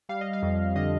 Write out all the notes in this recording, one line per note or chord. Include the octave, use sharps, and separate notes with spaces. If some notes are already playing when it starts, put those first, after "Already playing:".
G3 F5
D#5
F5
F2
D3 D#5